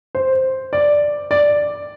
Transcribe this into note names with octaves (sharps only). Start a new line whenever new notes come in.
C5
D5
D5